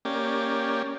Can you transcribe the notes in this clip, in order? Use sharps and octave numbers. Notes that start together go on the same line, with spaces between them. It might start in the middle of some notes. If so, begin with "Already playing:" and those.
A#3 C#4 G4 D5